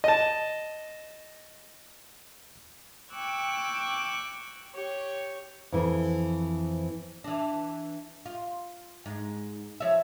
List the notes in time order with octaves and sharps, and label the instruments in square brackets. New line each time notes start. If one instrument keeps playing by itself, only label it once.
[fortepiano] D#5 A5
[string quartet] G5 C#6 D6 E6 F#6 G#6
G4 C#5 C#6
[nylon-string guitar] F2 E3
[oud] E3 D4
F4
G#2
F3 C#5 E5